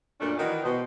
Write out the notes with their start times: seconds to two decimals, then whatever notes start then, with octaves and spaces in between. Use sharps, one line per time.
0.20 F#2 A#2 A3 C#4 D4
0.38 D#3 E3 D#4 F#4 A#4 D5
0.63 B2 D#4 C5